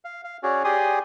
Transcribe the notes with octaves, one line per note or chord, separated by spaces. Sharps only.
F5
F5
C#4 F#4 G#4 C#5 D5
G4 G#4 D5 G#5 C6 D#6